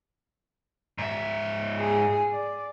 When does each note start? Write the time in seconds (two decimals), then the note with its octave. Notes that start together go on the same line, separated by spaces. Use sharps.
0.98 G#2 E5
1.80 G#4
2.32 D5